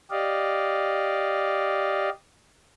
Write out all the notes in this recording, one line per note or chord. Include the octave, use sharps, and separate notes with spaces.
G4 D5 D#5 F5